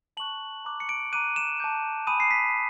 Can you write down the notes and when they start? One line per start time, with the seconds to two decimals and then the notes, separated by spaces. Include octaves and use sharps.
0.17 A5 C#6 F#6 F#7
0.65 A#5 D6 F#6
0.80 C#7
0.89 D7
1.12 A#5 D6 F#6 D#7
1.36 E7
1.60 A5 D6 G6
2.07 G#5 B5 D#6 D#7
2.20 C7
2.31 B6